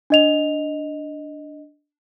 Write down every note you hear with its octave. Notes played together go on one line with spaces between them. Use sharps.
D4 D#5 F7